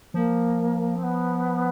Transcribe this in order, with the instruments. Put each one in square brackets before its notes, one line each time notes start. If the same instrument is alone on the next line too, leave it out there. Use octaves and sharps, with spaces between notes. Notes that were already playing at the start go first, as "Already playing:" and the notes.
[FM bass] F3 [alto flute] A#3
[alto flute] C4
B3